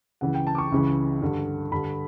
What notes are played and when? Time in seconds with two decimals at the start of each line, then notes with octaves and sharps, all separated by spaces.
0.21 C#2 C#3 E3 F#5
0.34 G5
0.47 A5
0.55 D6
0.58 C#6
0.72 C#2 C#3 E3
1.22 G2 D3
1.72 G2 D3 B5